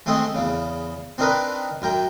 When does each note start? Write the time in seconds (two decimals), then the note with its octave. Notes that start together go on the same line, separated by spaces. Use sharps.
0.06 G#3 A3 C4 A4 D#5
0.34 E2 C#3
1.18 C4 D4 D#4 A#4 B4
1.82 F#2 A#4 G5